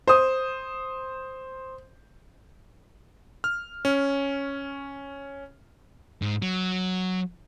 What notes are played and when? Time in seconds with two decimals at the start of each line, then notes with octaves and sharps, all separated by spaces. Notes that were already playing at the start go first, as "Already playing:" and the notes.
0.07 C5 D#6
3.44 F6
3.85 C#4
6.22 G#2
6.42 F#3